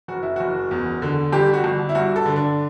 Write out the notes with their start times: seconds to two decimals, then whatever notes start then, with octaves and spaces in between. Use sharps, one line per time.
0.08 F#1 F#4
0.22 E4
0.36 F#1 F#4
0.71 E2
1.02 D3
1.32 G1 G4
1.53 F#4
1.64 G1
1.89 E4
1.95 G2 F#4
2.16 A4
2.26 D3
2.36 D4